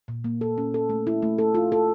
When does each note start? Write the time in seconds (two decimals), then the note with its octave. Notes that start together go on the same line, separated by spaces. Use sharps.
0.08 A#2
0.24 A#3
0.41 A4
0.58 C#4
0.74 A4
0.90 A3
1.07 E4
1.22 A3
1.38 A4
1.54 F4
1.72 A4